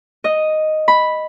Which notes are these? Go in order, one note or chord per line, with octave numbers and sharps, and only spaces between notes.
D#5
B5